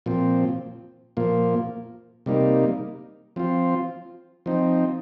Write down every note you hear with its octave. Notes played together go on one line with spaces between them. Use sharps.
A#2 F3 C4
A#2 F3 A#3
C3 G3 A#3 D#4
F3 C4 F4
F3 C4 D#4